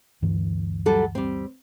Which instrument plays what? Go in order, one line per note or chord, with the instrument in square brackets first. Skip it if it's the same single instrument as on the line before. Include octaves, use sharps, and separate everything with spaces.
[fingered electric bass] D2 G2 E3
[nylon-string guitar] F#3 G3 A4
G3 C4